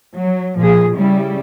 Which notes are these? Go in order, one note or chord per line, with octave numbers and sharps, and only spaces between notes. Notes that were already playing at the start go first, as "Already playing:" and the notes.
F#3
A#2 F3 G#4
C#3 G3 E4